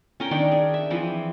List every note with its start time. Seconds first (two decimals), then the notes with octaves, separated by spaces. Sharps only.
0.20 C#4 A#4 G5
0.31 D#3 D4 D5 G5
0.52 G#4
0.74 E5
0.90 E3 F3 C4 B4